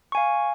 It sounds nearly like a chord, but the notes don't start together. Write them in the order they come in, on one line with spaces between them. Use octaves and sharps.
C#6 G#5 F5